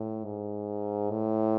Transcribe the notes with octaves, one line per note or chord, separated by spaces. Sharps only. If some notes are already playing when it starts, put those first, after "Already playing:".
Already playing: A2
G#2
A2